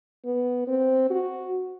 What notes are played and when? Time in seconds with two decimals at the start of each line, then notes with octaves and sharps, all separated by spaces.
0.25 B3
0.68 C4
1.10 F#4